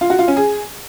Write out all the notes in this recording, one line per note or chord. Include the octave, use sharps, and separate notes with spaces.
F4
F#4
F4
C#4
G#4